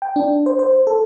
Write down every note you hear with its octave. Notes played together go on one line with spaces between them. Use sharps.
G5
D4
C5
C5
A4